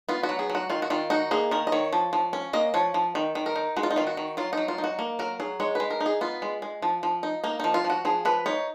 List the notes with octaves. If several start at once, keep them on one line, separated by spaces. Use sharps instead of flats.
B3 F4
F#4
F#3
G#4
F#3
F#4
D#3 F4
F#4
D#3 F4
D#4 F#4
A#3 G#4
D#3 A#4
D#5
D#3 C#5
F3
F3
C#4
A#3 D#5
F3 C#5
F3
D#3
D#3
A#4
D#4
G#3 F#4
F4
D#4
D#3 F4
F#4
D#3
F#3 F4
F#3 D#4
F4
D#4
F#4
A#3
F#3 A#4
F#3 G#4
G#3 C#5
G#3 B4
A#4
D#4
G#4
B3 F4
G#3
G#3
F3
F3
D#4
A#3 D#4
F3 D#4
F4
F3
F#4
F3 G#4
F3 B4
D#4 C#5